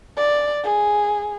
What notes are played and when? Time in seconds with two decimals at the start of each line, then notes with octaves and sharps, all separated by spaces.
0.17 D5
0.64 G#4